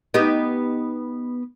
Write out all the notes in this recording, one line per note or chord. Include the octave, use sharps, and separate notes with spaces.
B3 D#4 G4